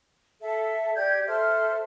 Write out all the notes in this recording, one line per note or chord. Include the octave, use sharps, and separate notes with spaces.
A4 E5
G4 D5 G6 G#6
A4 C5 E5 F6